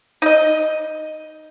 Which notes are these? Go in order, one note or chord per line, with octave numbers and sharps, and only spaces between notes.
D#4 D#5